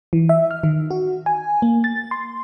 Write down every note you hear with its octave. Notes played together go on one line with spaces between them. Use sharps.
E3
E5
F6
D#3
F#4
G#5
A#3
A6
C6